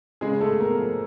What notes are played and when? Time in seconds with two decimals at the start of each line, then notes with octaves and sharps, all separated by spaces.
0.21 C#3 G#3 G#4
0.40 G#3 A3 A4
0.60 A#3 B3 A#4
0.79 F3